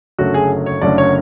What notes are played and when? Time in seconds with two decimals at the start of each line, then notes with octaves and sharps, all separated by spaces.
0.18 F#1 F#2 D3 F#3 A3 F#4
0.34 G#4
0.66 C#5
0.82 F#1 F#2 D3 F#3 A3 D5
0.98 C#5